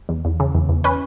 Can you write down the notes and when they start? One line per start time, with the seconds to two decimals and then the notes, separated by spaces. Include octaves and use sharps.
0.09 E2
0.25 E2
0.40 C#3
0.55 E2
0.69 E2
0.84 C#4 B4